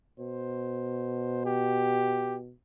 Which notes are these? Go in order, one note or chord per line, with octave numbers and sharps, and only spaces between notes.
B2 C5
G4